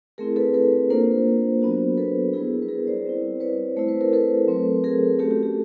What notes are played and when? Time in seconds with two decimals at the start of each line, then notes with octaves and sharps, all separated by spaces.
0.18 A3 C4 E4 G#4 A#4
0.36 A4 B4
0.54 A4 B4
0.90 A#3 D4 F4 A#4 C5
1.61 F#3 B3 D4 F#4
1.97 A4 B4
2.33 G3 B3 E4 G#4 A#4
2.62 B4
2.68 G#4 A#4
2.87 C5 D5
3.04 G3 C4 E4
3.40 B4 C#5
3.77 A3 C4 E4 C5
3.88 B4
4.01 A#4
4.13 A4 B4
4.47 F#3 A3 C4
4.84 G#4 A#4
5.19 A3 C#4 F#4 G4 A4
5.31 G4
5.43 G4